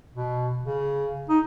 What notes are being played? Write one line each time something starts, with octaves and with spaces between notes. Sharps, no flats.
B2
C#3
D#4